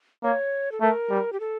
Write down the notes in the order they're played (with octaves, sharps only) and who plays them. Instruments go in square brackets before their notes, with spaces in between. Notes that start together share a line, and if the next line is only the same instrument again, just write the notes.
[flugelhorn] A#3 [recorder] C#5
[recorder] A4
[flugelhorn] A3 [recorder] A#4
[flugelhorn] G3
[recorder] G4
A4